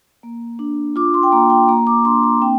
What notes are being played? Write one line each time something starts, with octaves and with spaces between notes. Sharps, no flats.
A#3
D4
F4 D6
C6
G5
A#3 A#5
G5
A#3 A#5
D6
D4 C6
A#5
C4 G5